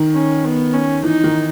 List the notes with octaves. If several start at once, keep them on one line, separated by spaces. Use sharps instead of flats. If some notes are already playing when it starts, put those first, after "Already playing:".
Already playing: D#3
C#4
B3
C#4
E3 D#4
D#3